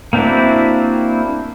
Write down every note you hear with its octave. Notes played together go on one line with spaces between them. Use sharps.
A#3 C4 D4 E4 F#4